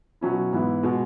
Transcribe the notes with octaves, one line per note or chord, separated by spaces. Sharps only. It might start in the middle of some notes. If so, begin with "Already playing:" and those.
B2 F#3 C#4 E4
G#2 E3 B3 E4
B2 G#3